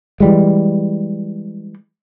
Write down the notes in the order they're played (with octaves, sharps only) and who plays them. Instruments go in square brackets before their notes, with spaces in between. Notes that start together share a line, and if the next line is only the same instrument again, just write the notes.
[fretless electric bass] E3 G3 G#3